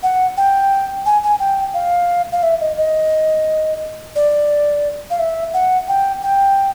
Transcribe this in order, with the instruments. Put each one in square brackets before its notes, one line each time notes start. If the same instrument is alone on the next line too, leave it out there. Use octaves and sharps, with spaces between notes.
[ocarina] F#5
G5
G#5
G#5
G5
F5
F5
E5
D#5
D#5
D5
F5
E5
F#5
G5
G5